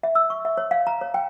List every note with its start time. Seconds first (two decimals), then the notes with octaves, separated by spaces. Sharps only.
0.03 E5
0.15 E6
0.30 C#6
0.45 E5
0.57 C#5
0.71 F5
0.87 A#5
1.01 C#5
1.14 G5